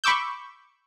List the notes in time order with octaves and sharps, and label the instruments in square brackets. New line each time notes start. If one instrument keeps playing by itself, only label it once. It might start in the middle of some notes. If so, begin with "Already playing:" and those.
[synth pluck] B5 C#6 D6 E6 G6